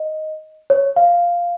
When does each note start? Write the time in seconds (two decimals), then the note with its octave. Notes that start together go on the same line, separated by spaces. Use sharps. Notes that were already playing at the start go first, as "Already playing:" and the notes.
Already playing: D#5
0.70 C#5
0.96 F5